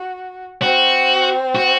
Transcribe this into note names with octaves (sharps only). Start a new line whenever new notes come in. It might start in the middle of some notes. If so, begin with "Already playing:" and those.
Already playing: F#4
C4 F#4
F#4